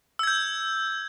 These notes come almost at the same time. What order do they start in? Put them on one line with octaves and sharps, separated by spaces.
E6 G#6 G6